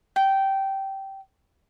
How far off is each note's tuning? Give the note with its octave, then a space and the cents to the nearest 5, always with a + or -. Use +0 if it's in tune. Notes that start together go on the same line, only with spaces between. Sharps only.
G5 -15